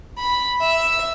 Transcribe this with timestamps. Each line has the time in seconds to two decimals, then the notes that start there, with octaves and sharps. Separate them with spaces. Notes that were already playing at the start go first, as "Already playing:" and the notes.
0.18 B5
0.61 E5